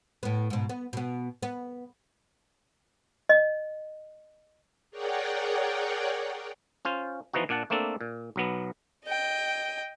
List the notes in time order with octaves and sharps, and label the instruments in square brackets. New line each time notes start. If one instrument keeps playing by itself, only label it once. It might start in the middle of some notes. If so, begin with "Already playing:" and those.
[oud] A2 B3
G#2 B2
B3
B2 B3
B3
[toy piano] D#5
[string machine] G#4 A#4 C#5 D5 F#5 G5
[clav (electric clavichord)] C#4 F4 C5
E3 F3 B3 D#4 F#4
A#2 D4 F#5 A5
A3 A#3 C4 D4 A4
A#2
B1 F#3 B3
[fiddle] D#5 G5